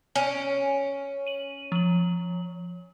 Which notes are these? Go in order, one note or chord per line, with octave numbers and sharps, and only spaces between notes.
C#4 G#5 F6 D7
D#7 F#7
F3 F#7